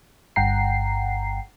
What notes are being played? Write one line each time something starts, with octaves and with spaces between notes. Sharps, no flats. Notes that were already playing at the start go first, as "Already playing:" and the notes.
G1 G2 F#5 G5 A#5 C7